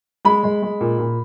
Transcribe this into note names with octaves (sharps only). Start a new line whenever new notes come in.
G#3 B5
G#3
G#3
A#2
A#2